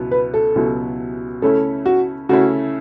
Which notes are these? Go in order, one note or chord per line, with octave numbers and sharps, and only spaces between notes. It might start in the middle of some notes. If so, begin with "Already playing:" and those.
Already playing: C#2 B2 F#3 B3 E4
B4
A4
C#2 B2 F#3 B3 E4
C#3 A3 C#4 E4 A4
F#4
C#3 A3 C#4 E4 F#4